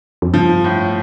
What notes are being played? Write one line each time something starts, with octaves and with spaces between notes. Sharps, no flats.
F2
G2 F3
A2